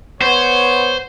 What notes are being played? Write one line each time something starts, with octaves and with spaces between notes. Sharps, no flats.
B3 C5 C#5